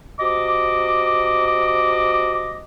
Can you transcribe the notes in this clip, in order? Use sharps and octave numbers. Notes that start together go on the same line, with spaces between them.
C3 F#4 D#5 D6